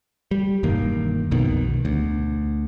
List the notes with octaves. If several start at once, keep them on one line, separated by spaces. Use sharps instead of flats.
G3
E1 G2 D#3 A#3
B1 F2 B2 D#3
D2